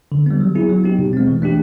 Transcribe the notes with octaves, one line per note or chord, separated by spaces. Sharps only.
D3
G3 B3
F#3
B3 E4 G#4
F#3
B3 D#4 G4
B2
G#3 C4
E3
A3 D4 G4